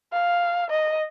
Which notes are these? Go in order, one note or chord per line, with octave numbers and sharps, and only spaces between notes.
F5
D#5